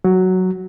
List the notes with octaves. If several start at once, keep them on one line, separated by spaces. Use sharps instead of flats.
F#3